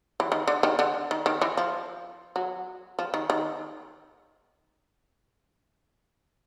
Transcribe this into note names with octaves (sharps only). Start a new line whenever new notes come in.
E3
D#3
D3
D#3
D3
D#3
D#3
E3
F3
F#3
F3
D#3
D#3